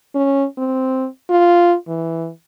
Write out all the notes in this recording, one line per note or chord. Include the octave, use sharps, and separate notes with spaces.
C#4
C4
F4
E3